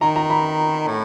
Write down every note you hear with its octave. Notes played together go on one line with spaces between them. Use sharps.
D#3 A#5
A#5
B5
A2